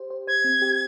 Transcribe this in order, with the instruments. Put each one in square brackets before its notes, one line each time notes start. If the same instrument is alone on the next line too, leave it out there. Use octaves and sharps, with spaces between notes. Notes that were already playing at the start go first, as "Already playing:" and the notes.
Already playing: [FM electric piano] G4 C5
C5
[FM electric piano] C5 [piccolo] G#6
[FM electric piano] C4
G4